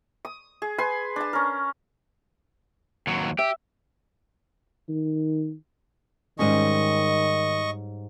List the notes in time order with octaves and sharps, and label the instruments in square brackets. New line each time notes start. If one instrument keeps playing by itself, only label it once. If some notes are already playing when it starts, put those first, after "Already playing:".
[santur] D#6
G#4
B4 G#5 C6
D4 A5
C#4 A#4
[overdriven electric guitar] D#2 F#3
[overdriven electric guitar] G4 [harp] E5
[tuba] D#3
[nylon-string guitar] G#2 G3 C#4 [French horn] D#3 [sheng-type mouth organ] D#5 C#6